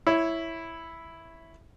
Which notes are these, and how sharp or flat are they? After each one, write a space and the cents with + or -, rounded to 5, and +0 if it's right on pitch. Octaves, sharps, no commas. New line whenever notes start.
E4 +0 C#5 +0